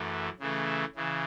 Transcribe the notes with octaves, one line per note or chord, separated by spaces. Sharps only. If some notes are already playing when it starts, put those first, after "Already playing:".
Already playing: F#2 E3 A3
C#3 E3 A3
C#3 E3